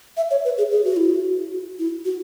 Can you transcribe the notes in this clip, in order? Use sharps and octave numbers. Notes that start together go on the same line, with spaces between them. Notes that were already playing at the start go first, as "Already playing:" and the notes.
E5
C#5
B4
G#4
G#4
F#4
E4
F#4
E4
F#4